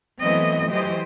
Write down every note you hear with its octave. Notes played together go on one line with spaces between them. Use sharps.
E3 F#3 A3 B3 C4 D#5
E3 F#3 G4 C5 D#5